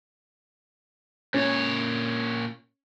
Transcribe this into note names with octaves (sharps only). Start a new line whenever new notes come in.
A#2 C#4 C#5